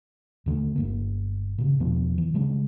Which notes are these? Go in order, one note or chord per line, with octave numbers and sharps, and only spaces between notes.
D#2 D3 F3 A3
G1 F2 A#3
A#2 C#3
E2 B2 F3 B3
E3
C#3 G3 G#3 D4